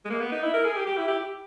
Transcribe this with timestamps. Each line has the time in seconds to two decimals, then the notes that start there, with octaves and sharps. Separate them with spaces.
0.05 G#3
0.10 A#3
0.21 B3
0.32 D#4
0.42 E4
0.54 A#4
0.65 G#4
0.76 G4
0.87 G4
0.97 E4
1.08 G4